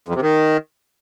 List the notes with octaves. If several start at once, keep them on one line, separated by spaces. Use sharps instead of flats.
F2
C3
D#3